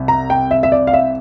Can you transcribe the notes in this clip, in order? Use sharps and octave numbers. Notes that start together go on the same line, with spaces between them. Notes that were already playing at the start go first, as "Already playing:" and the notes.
Already playing: C2 C3
A#5
G5
E5
E5
D5
F5
E5